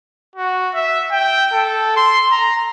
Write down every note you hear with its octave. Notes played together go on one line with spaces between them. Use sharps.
F#4
E5
G5
A4
C6
A#5